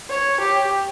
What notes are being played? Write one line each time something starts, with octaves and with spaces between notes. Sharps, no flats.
C#5
G4